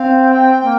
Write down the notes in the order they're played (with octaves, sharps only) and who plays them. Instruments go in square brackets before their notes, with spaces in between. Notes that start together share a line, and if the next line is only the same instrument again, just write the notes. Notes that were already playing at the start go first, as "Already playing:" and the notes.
Already playing: [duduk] C4 [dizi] F5
[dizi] G5
[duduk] A#3